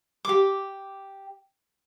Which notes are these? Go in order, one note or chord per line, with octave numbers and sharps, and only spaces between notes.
G4 D6